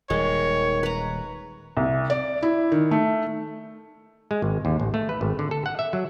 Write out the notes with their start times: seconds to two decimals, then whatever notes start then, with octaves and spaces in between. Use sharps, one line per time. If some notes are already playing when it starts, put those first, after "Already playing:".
0.10 D#1 D#3 G3 G#3 C#5
0.83 B4 A#5
1.77 C2
2.10 D5
2.43 E4
2.72 D#3
2.91 A3
4.31 G#3
4.42 G#1
4.65 D#2
4.80 A1
4.94 A3
5.09 B4
5.21 G#1
5.39 D3
5.51 A4
5.66 F#5
5.79 E5
5.93 F#3